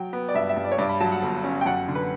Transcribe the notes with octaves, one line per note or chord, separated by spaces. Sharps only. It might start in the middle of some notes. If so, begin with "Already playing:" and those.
Already playing: F#3 G5
B3
D5
G2 E5
E5
G2
D5
C#5
G2 D5
B5
F#3 A5
F#5
G1
C#4
G5
F#2 F#5
D3
B4